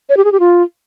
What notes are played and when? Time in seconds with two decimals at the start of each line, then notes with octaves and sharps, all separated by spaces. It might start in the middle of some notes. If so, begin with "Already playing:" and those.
0.09 C#5
0.17 G4
0.25 G#4
0.32 G4
0.40 F4